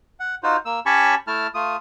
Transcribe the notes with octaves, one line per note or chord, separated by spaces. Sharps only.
F#5
D#4 F4 F#4 C5
A#3 E6
C#4 G4 C#5 A5 B5 C#6
A3 E4 A5 F6
A3 F4 D#6